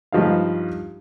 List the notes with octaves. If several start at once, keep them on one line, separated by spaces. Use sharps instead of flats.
G2 F3 D#4 F5